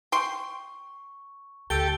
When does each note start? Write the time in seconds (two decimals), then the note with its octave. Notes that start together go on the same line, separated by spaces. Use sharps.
0.12 G5 C6 C#6
1.70 D2 G4 A4 E6 D7 G7